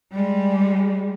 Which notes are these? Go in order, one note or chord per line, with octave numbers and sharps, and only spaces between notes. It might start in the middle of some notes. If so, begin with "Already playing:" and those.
G3 G#3